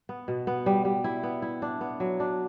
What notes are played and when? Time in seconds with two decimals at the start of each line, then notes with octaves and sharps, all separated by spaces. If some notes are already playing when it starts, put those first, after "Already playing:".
0.09 B3
0.28 B2
0.47 B3
0.66 G3
0.85 G3
1.04 E4
1.23 B3
1.42 E4
1.62 D4
1.81 B3
2.00 F#3
2.20 D4